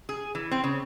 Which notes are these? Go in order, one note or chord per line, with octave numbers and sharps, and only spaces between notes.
G#4
E3
C4
C#3